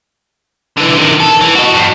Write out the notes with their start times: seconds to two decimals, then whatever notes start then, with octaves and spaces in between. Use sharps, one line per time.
0.77 D3 E3
0.97 C3 D#3
1.21 A4
1.41 E3
1.56 F#4 D#5
1.74 G2